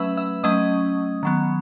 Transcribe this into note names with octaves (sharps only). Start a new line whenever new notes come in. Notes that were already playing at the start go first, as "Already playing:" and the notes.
Already playing: F#3 A3 C#4 B4 E5 B5 E6
E5 E6
F#3 A3 C#4 D#5 D#6
D#3 F#3 B3